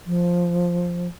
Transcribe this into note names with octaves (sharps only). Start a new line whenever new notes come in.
F3